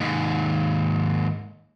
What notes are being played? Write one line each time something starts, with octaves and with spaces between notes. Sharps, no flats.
D#2 G#2